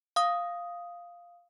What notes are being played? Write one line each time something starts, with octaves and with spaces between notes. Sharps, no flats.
F5 D#6